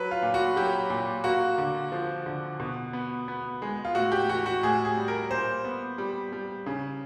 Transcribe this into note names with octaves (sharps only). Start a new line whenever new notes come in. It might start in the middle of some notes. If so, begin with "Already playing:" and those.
Already playing: F#3 B4
F4
A#2
F#4
F#3 G4
A#2
A#3 F#4
D3
F3
D3
B2
B3
B3
G#3
F4
A2 F#4
G4
E3 F#4
F#4
A2 G#4
G#4
G3
A#4
A#2 C5
B3
G3
G3
C#3